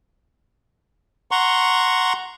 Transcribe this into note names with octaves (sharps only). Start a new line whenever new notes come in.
F#5 A#5 C6 C#6